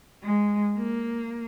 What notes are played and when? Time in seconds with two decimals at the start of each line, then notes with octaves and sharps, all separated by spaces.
0.23 G#3
0.77 A#3